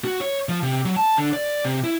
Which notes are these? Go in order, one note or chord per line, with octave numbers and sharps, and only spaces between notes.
F#4
C#5
F3
C3
F#3
A5
D3
D5
C3
E4